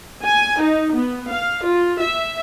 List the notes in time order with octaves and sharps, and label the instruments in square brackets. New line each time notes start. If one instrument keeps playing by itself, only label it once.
[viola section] G#5
D#4
B3
F5
F4
E5